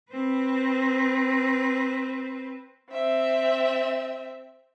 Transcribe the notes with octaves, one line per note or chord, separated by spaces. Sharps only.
C4 B4
C4 E5